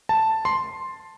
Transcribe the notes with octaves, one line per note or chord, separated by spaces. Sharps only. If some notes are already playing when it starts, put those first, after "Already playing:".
A5
C6